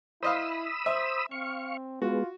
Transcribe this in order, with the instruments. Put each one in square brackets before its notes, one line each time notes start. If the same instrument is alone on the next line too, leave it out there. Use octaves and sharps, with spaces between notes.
[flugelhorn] E4 [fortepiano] C5 D#5 F5 [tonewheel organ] B5 D#6 E6
[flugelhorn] C5 [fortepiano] E5
[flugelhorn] C4 [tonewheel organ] F5 C#6
[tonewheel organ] G#3 B3 [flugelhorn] F4 [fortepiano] F#4